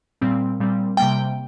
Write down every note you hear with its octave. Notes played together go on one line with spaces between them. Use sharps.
A#2 G3 C4
A#2 G3 C4
C3 G3 A#3 G5